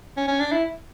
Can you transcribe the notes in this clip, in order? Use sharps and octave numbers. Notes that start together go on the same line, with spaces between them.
C#4
C#4
D4
E4